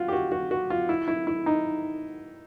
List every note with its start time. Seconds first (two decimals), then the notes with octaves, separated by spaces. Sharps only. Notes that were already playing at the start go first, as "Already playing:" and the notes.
Already playing: F4 F#4
0.08 G4
0.13 F#4
0.32 F#4
0.51 F#4
0.70 F4
0.89 E4
1.08 E4
1.27 E4
1.46 D#4